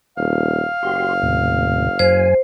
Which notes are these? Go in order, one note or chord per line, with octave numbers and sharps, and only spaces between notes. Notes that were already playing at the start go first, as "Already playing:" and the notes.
D#1 F5
F#1 F#4 G4 C6
D#2 A2 C3
F#2 C5 G#5